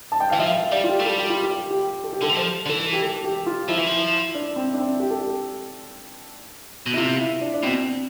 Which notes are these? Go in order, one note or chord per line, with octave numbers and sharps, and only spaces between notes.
A5
G5
E3 F5
F3 E5
F5
G3 D5
F4
G4
A3
G3 A4
G4
F4
G4
G4
A4
G4
D3 A4
E3
F3 C5
D3
E3 A4
G4
A4
G4
F4
F3 E4
E3
F3
D4
C4
D4
C4
G4
A4
G4
B2
E4
C3 F4
E4
D4
D4
B2 C4